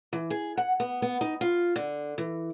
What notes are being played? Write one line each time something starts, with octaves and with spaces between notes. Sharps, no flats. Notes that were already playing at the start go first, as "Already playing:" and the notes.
E3
G#4
F#5
B3
B3
D#4
F4
D3
E3